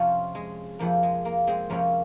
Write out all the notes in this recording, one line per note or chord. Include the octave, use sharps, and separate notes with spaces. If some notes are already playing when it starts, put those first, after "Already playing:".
Already playing: F2 C3 F3 C#4 F4
G#3
F2 C3 F3 A#3
G#3
A#3
G#3 C4
F2 C3 F3 A#3 C#4